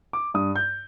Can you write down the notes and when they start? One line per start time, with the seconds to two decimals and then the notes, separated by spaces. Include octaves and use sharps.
0.13 D6
0.34 G2 D#6
0.56 G6